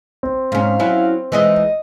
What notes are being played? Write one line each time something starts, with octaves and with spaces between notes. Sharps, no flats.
C4
G#2 C#4 F5
F#3 C#4 E4
E3 G#3 D#4 D#5